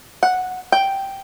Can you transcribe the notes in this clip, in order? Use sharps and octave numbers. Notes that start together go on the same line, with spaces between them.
F#5
G5